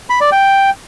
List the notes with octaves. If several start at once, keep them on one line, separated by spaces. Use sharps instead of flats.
B5
D5
G5